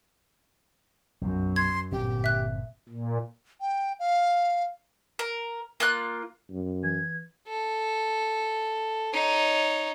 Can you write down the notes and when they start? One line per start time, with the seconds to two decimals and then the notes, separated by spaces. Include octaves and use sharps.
1.21 B1 F#2
1.56 C6 G#6
1.92 G1 A#2 D3 C4 G4
2.24 E5 F#6
2.89 A#2
3.61 G5
4.00 F5
5.19 A#4
5.80 A#3 F4 F#6
6.50 F#2
6.83 E3 G#6
7.47 A4
9.14 D#4 C#5